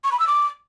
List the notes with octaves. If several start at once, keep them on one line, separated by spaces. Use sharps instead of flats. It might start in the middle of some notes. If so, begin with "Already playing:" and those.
C#6
B5
E6
D6